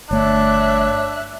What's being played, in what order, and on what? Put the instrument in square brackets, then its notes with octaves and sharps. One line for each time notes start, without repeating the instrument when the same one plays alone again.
[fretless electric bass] G1 A3 [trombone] D4 [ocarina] C#5 [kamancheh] E5 F#6